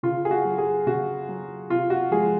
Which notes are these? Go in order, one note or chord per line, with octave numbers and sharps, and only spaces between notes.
C#3 F4
G#4
F#4
F#3
G#4
C#3 F#4
F#3
C3 F4
F#4
F3 G#3 G#4